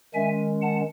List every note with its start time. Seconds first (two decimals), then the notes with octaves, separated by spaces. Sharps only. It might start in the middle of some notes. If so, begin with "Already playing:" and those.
0.14 D#3 G#3 C#4 E5 G#5
0.62 F#5 A5